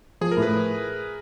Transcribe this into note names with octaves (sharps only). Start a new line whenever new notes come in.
F3 G#4
A#4
A2
B4